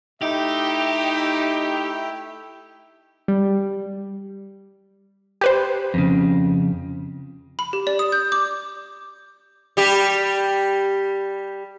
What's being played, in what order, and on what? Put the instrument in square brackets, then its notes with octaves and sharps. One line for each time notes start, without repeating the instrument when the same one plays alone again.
[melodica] A3 E4 G5 [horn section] D#4 [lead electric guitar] G4 [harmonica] E5
[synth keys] G3
[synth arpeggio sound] G4 B4 C5
[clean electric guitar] F2 C#3
[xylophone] B5
G4
D5
D#6
G6
D6
[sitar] G3 G4